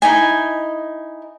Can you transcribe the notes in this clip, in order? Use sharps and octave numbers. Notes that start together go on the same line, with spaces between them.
D#4 E4 D#5 G#5